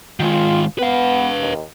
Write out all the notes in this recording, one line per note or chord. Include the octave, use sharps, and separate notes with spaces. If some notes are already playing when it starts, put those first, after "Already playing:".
D#3 G#3 F4
B3 B4 F5
D#2